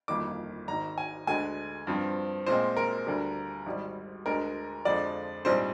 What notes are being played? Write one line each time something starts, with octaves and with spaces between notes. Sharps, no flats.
G1 F2 D#3 A#3 D6
G#1 G#2 D#3 A#5
G#5
D2 D3 G#3 G#5
G2 F3 C4
A#1 A#2 G#3 C4 C5
A#4
D2 D3 G3
G#1 G#2 G3
D2 D3 G#3 A#4
F2 D3 F3 G#3 D5
A#1 G#2 G3 C4 C5